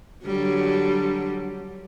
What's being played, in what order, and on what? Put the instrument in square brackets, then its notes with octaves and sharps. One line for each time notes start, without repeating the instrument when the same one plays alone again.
[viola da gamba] D3 F#3 G3